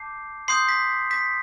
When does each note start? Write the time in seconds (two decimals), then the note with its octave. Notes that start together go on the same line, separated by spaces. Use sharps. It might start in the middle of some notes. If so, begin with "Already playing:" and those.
Already playing: A5 D6 G6 C7
0.48 C6 D#6 G6 C7
0.69 B6
1.11 B6